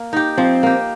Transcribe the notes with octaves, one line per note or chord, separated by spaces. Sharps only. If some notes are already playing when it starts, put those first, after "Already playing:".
Already playing: A#3
D#4 G4
F3 C4
A#3 G4